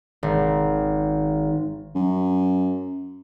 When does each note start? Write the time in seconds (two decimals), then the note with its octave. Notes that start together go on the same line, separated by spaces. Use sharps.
0.23 G#1
1.95 F#2